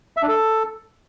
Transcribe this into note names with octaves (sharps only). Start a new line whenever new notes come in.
E5
D4
A4